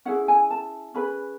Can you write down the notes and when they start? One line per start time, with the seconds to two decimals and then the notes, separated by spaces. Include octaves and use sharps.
0.05 C#4 E4 G#4 F#5
0.28 G#5
0.51 A5
0.94 C#4 G#4 B4 B5